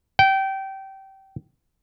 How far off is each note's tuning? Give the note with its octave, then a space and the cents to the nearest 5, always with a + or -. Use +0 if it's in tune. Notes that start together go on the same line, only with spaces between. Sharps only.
G5 -20